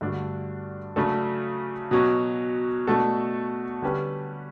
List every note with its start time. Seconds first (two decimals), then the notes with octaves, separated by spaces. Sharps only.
0.01 G2 D3 A3 D4 F#4
0.96 C#3 F#3 A3 D4 A4
1.91 B2 F#3 C#4
2.87 B2 A3 D4 F#4 A4
3.82 D3 G3 C#4 G4 B4